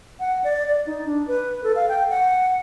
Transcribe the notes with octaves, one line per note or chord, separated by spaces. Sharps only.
F#5
D5
D5
D#4
D4
B4
A4
F5
G5
F#5